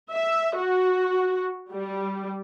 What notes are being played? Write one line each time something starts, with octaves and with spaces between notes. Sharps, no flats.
E5
F#4
G3